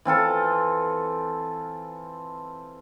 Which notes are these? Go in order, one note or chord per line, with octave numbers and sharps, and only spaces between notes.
E3 C4 F4 A4